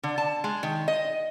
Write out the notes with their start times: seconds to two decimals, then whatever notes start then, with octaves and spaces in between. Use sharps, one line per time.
0.03 D3
0.18 A5
0.44 G#3
0.63 D#3
0.88 D#5